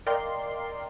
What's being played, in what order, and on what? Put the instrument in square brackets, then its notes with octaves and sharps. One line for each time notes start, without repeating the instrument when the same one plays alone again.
[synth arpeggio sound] A#4 D5 D#5 F5 G5 C6